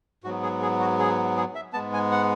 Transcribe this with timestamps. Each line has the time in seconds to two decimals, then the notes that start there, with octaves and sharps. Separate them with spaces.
0.24 G#2 F#4
0.27 F#3 B3
0.43 G#4
0.62 G#4
0.80 F#4
0.99 G#4
1.37 G#4
1.55 E5
1.73 G#2 G#3 B3 A5
1.93 G#5
2.11 F#5